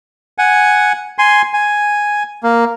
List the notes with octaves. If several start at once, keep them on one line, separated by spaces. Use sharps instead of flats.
F#5 G#5
G#5 C6
G#5
A#3